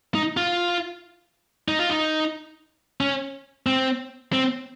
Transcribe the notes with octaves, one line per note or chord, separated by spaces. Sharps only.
D#4
F4
D#4
F4
D#4
C#4
C4
C4